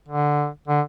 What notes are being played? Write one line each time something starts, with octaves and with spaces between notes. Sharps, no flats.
D3
D3